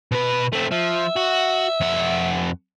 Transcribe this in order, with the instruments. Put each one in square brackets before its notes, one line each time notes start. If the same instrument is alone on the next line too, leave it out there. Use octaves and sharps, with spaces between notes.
[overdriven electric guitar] B2 B4
A3 C4
[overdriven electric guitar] F3 [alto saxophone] E5
[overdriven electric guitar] F#4
F2 F#5